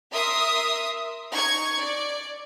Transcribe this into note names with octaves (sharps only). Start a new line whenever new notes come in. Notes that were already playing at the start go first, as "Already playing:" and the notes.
A#4 E5 C6 D#6
D#4 C#6 G#6
D5